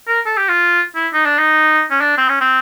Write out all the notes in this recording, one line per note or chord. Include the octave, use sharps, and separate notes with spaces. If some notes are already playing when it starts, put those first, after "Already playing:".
A#4
A4
G4
F4
E4
D#4
D4
D#4
C#4
D4
C4
C#4
C4